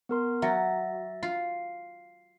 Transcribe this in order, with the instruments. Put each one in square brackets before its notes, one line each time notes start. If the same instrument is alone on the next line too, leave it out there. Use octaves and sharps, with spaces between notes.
[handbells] B3 A#4 C6
[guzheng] F#3 [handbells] E5 A6 A#6
[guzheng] F4 [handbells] C7